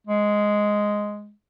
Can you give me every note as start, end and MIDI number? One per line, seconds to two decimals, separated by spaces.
0.07 1.32 56